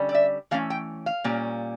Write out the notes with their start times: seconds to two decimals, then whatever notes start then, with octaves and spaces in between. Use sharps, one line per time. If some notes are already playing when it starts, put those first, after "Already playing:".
Already playing: D3 G3 C#4
0.09 D5
0.15 E5
0.51 E3 A3 C#4 F5
0.70 G5
1.06 F5
1.24 A#2 G3 A#3 C#4